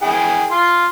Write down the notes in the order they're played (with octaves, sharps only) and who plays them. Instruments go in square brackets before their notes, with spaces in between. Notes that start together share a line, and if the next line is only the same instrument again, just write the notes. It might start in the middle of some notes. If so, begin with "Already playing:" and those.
[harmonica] E4 G#4 G5
F4 C6